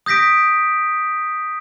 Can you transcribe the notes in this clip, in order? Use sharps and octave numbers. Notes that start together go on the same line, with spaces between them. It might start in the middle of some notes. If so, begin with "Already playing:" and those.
D#6 G6 A#6 B6 D7